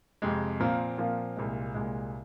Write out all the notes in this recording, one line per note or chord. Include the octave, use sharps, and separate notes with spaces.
F2 C3 G#3
A#2 F3 C4 F4 A#4
A#2 F3 C4 F4 A#4
C2 A#2 G#3
C2 A#2 G#3